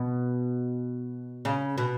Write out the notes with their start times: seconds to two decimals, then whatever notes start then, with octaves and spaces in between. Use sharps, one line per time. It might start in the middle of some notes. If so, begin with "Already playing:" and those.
Already playing: B2
1.45 C#3
1.78 B2